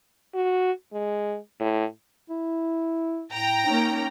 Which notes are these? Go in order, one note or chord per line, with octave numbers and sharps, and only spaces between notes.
F#4
G#3
A2
E4
A2 G5 A#5
A#3 C#4 D#4